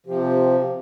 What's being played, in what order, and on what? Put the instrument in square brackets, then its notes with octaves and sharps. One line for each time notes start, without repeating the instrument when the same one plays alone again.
[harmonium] C3 F3 [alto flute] G4